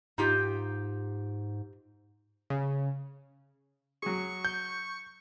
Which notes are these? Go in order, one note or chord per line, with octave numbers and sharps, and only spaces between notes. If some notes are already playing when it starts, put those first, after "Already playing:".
G#2 D#4 F4 G4
C#3
F#3 G#4 C#6
G6